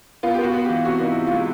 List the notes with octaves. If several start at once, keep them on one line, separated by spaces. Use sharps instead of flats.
B3 F4
G4
B3 F#4
B3
E3 G4
C3 F#4
B3 D#4
E4
C3
G#3 F4